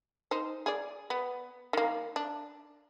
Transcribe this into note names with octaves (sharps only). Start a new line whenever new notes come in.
D#4 C5
G#4 D5
B3
D#3 A#3
D4